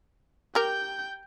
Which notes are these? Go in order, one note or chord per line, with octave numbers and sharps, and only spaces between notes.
G4 A#4 G5 G6